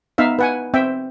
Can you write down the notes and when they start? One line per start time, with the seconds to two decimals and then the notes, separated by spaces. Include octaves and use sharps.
0.18 B3 D#4 E5 F5
0.39 B4 F#5 G#5
0.74 C4 E5 G5